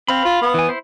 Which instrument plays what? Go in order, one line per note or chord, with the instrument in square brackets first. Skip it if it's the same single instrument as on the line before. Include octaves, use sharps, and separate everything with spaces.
[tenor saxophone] C4 [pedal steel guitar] F5 B5
[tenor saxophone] F4
B3
[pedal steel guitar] E3 G#5
E4 C5